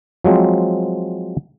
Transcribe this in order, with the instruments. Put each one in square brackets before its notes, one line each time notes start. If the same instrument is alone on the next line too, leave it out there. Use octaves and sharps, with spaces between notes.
[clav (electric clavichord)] F3 F#3 G#3 C4